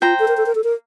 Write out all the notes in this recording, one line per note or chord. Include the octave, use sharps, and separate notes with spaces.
F4 C5 G5 A#5
A4
A#4
A4
A#4
A4
A#4